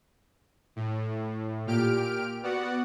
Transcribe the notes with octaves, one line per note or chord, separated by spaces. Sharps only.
A2
A#2 G4 F6 D7
B3 F#4 D5 F#5